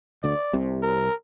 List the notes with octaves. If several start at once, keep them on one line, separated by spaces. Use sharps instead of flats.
D2 D3 D5
C2 C3
A#4